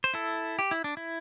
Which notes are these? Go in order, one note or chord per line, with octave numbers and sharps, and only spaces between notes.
C5
E4 A4
G4
E4
D4
E4